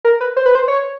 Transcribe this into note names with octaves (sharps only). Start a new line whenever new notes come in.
A#4
B4
C5
B4
C5
C#5